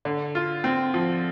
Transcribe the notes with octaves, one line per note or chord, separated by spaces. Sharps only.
D3
F4
C4
F3